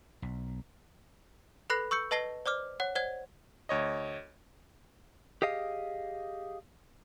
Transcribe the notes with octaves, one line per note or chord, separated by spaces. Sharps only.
B1
A4 B4 B5 F#6 A#6 C7
C#6 E6 G6 C#7
B4 D#5 A5 A#6 C7 G7
C5 D5 D6 F6
C#5 F#5
C5 D5 F#5 G#6
D2 C#5 D#5
G4 G#4 D#5 F5